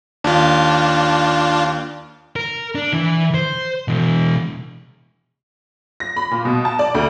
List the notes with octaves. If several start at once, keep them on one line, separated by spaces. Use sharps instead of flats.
D#2 D4 F4
A#4
D4
E3
C5
B2 E3
A#6
B5
A#2
B2
A5
D5
D2